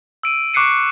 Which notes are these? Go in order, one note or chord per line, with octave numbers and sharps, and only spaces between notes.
E6 D7 D#7
C#6 D6 F#6 C7 C#7 D#7